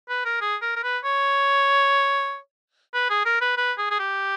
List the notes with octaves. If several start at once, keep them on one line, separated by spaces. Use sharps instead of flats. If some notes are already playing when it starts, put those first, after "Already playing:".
B4
A#4
G#4
A#4
A#4
B4
C#5
B4
G#4
A#4
B4
B4
G#4
G#4
G4